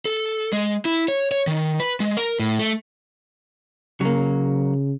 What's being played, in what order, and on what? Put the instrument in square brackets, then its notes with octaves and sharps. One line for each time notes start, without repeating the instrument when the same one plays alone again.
[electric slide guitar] A4
G#3
E4
C#5
C#5
D#3
B4
G#3
A#4
A2
A3
[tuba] C#3 [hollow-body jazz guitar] F#3 A#3